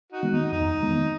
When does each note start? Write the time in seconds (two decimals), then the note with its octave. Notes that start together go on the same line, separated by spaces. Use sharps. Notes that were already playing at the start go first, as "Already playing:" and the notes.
0.12 D#4 F#4
0.23 D#3 G#3 B3
0.33 D#4
0.52 F2 D#4
0.82 D#3 G#3 B3